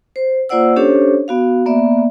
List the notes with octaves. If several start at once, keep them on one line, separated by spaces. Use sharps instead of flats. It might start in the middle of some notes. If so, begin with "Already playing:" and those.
C5
A#3 F4 C5 D5 F#5 E6
C#4 D4 G4 A4 C5 C#5
B3 F#4 F5
A#3 B3 D5 E5